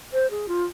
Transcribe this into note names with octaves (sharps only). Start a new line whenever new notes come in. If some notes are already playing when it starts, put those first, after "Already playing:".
C5
G#4
F4